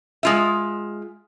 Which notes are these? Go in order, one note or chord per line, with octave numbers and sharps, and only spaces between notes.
G#3 F4 E5